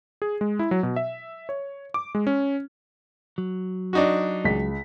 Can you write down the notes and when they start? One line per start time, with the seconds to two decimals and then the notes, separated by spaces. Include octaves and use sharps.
0.22 G#4
0.41 G#3
0.59 E4
0.71 F#3
0.83 B2
0.96 E5
1.49 C#5
1.94 D6
2.15 G#3
2.27 C#4
3.38 F#3
3.93 D4 D#4 F#4
4.45 C#2 B6